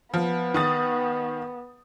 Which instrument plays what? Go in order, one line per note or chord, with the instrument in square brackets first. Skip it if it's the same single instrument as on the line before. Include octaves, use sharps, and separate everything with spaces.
[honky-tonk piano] F3 [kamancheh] B3
[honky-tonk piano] D#3 D#6 A6